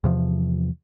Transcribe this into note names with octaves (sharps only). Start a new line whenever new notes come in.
E2 C3 F3